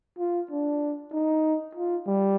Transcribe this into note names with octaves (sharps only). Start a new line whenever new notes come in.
F4
D4
D#4
F4
G3